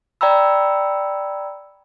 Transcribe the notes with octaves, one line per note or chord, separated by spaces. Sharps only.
D5 G5 A#5 B5 E6